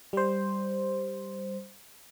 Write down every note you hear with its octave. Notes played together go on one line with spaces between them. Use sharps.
G3 C5